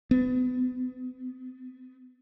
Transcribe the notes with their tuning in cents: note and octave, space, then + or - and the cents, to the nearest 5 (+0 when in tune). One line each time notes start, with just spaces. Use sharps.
B3 +35